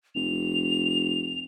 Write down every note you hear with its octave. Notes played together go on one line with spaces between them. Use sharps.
F1 F7